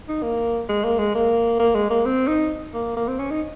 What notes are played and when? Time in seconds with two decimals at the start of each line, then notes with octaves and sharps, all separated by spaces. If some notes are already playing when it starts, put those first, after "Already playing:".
0.09 D#4
0.23 A#3
0.69 G#3
0.84 A#3
0.99 G#3
1.15 A#3
1.60 A#3
1.75 G#3
1.90 A#3
2.05 C4
2.28 D#4
2.74 A#3
2.97 A#3
3.08 C4
3.19 C#4
3.30 D#4